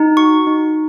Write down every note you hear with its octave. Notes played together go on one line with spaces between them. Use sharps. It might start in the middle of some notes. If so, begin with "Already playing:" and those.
Already playing: D#4
F#4 C#6
D#4